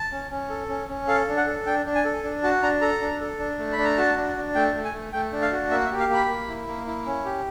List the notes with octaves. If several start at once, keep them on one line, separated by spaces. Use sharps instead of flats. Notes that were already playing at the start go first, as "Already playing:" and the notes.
Already playing: A5
C#4
C#4
A4
C#4
C#4
A4 F5
D4
F#5
A4
D4 G5
D4
G#5
A4
D4
F#4 A5
D4 A#5
A4 A#5
D4
A4
D4
A3
B5
D4
A#5
F#4 A5
D4
D4
A3 G5
A3
G#5
A3
A3 G5
D4
F5
F#4
A#3 E5
E5
G4
F5
A#3 B5
A#3
E4
A#3
E4
C#4
G4